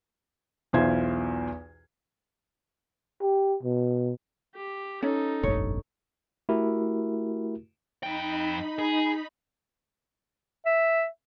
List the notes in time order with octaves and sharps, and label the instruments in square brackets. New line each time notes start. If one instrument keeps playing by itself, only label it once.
[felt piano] B1 E2 E4 F4 C5 G#6
[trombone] G4
B2
[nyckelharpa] G4
[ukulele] C#4 [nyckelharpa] D#4 A4
[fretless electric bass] F1 A#1 G2 [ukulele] C#5
[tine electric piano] A3 E4 F#4 G4 A#4
[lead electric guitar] F2 G5 [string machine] D#4 B5
[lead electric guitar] G#4
[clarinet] E5